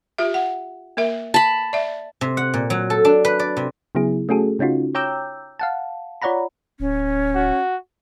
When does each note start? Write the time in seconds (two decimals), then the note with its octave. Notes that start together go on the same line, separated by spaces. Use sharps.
0.18 F4 G4 E5
0.34 F#5
0.97 A#3 A#4 E5
1.34 A5 B5
1.73 D5 E5
2.21 C3
2.37 F#5
2.54 A#2
2.70 F#3
2.90 A4
3.05 D4
3.25 B4
3.39 D5
3.57 C3
3.95 C#3 F#3 B3 E4 G#4
4.29 A3 C#4 F#4 G#4 A4
4.59 C#3 C#4 D#4 F4 F#4
4.95 C#5 G5 A#5 D6 E6 G6
5.59 F5 F#5 A5
6.22 F4 C#5 D5 F#5 A#5 B5
6.80 D1 C#4
7.35 F#4